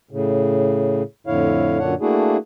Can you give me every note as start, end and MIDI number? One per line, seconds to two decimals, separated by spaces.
0.11 1.03 45
0.11 1.03 49
1.27 1.79 41
1.27 1.79 45
1.27 1.79 50
1.27 1.79 64
1.27 1.79 73
1.27 1.79 77
1.79 1.94 42
1.79 1.94 46
1.79 1.94 50
1.79 1.94 62
1.79 1.94 73
1.79 1.94 78
2.01 2.37 57
2.01 2.37 58
2.01 2.37 62
2.01 2.37 64
2.01 2.37 66
2.01 2.37 68